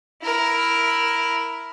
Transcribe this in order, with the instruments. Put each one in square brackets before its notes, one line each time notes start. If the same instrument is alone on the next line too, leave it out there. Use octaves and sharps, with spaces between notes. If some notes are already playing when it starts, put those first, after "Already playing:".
[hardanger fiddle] E4 A#4